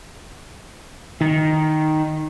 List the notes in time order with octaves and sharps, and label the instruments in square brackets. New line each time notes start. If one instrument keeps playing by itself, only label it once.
[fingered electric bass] D#3